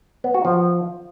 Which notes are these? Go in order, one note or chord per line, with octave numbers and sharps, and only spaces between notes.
B3
F#4
F3